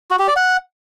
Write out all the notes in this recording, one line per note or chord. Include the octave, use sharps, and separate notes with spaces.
F#4
G4
D5
F#5